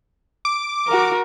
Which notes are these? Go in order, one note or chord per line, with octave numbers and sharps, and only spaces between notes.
D6
F#4 A#4